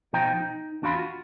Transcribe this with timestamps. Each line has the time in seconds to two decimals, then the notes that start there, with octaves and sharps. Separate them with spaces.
0.13 B2 F3 D#4 C5 G5 A#5
0.41 D#4
0.82 E2 D4 F#4 F5 B5 C6
0.95 F4 F#4